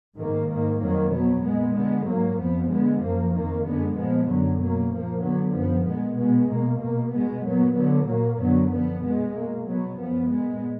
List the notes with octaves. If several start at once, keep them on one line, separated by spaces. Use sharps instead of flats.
G#2 D#3 A#3
G#2 D#3 A#3
F2 D#3 F#3 A#3
B2 F#3 B3
A#2 G#3 B3
D3 G#3 B3
G#2 F#3 A#3
F2 F3 B3
D3 G#3 B3
F#2 F3 A#3
F2 D#3 A#3
F#2 D3 G#3 B3
A#2 F3 G#3 B3
F#2 D3 F#3
B2 F#3 A#3
A#2 F3 A#3
D3 F#3 B3
F#2 F3 B3
A#2 G#3 B3
B2 G#3 B3
B2 A#3
B2 A#3
B2 G#3 B3
A#2 F#3 B3
D3 F#3 B3
A#2 F#3 A#3
F#2 D3 F#3 B3
D3 F3 B3
B2 G#3 B3
B2 A#3
B2 F#3 B3
F#2 F3 B3
A#2 G#3 B3